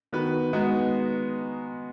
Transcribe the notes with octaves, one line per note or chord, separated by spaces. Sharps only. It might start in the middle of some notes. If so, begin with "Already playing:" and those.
D#3 B3 F#4 B4
G#3 B3 D#4 F#4